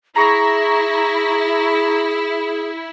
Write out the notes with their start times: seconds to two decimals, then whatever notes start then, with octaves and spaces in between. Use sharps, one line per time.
0.16 E4 G#4 A#5 C#6 A#6